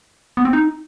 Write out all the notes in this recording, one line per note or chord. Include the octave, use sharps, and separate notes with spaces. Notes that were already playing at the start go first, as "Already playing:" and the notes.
B3
C4
D#4